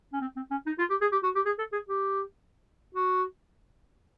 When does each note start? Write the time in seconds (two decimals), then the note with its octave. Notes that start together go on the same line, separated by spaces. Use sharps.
0.13 C#4
0.21 C4
0.36 C4
0.51 C#4
0.66 D#4
0.79 F4
0.90 G4
1.01 G#4
1.12 G4
1.23 F#4
1.35 G4
1.46 G#4
1.58 A4
1.73 G#4
1.89 G4
2.95 F#4